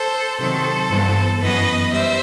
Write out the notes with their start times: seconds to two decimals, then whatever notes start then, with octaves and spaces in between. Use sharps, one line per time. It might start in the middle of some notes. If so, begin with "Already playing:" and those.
Already playing: A4 C5
0.39 C3 D#3 F#3 C4 A4 C5
0.90 G2 E3 B3
1.41 F#2 E3 B3 B4 D#5
1.92 G3 C5 E5